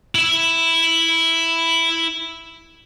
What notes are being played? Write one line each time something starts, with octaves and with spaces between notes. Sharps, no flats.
E4 E5